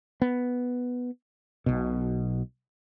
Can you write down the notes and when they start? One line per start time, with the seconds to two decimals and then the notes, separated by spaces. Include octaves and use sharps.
0.22 B3
1.66 B1 B2